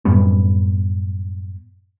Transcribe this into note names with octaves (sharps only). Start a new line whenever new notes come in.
F#2 A2 G3 B3